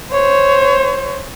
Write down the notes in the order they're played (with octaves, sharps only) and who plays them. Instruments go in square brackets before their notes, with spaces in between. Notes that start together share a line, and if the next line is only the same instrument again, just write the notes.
[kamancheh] C5 C#5